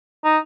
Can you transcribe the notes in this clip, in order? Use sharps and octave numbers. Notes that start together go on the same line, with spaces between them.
D#4